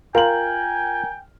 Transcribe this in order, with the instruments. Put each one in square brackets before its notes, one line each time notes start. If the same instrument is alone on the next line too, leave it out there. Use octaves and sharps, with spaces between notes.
[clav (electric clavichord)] F4 [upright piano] A#4 F#7 [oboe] G5 [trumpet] G#5